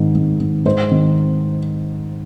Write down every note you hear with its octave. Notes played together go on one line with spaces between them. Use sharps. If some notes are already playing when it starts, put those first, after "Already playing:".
Already playing: G#2 D#3
G#2
D#3
G#2 C5
D#3